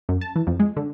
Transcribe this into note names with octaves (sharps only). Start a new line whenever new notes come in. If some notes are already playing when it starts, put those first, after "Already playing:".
F#2
A5
E3
F2
G#3
D3